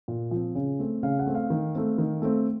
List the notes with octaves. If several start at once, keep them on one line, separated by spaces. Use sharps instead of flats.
A#2
F3 C4
C#3
A3 C4
C#3 F5
F#5
A3 C4
F5
D#3
A3 C4
D#3
A3 C4